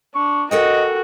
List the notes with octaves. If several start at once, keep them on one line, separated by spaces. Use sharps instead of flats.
D4 C#6
F#4 A4 A#4 D#5 G5